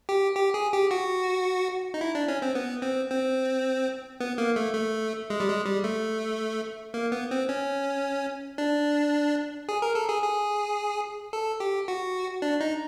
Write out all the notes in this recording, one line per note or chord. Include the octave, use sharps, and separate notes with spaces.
G4
G4
G#4
G4
F#4
D#4
E4
D4
C#4
C4
B3
C4
C4
B3
A#3
A3
A3
G#3
G3
G#3
G3
A3
A#3
B3
C4
C#4
D4
G#4
A#4
A4
G#4
G#4
A4
G4
F#4
D4
D#4